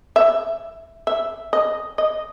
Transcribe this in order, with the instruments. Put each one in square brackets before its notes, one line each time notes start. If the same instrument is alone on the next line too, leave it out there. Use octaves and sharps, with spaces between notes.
[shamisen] E5
E5
D#5
D#5